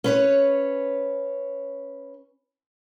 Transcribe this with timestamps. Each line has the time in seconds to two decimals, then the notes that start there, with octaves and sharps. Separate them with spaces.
0.04 C#4 B4 C#5